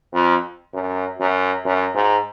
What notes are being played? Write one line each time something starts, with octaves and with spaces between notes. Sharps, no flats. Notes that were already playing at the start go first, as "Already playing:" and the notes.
F2
F#2
F#2
F#2
G#2